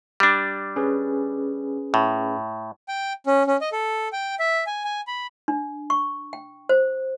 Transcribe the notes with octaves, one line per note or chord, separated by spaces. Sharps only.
G3 D4
C#4 G#4 B4
A2
G5
C#4
C#4
D#5
A4
G5
E5
G#5
G#5
B5
D4
C#6
G5
C5